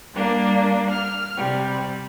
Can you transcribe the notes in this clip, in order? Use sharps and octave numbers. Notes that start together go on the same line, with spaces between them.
G3 A#3 D4
F6
C3 G3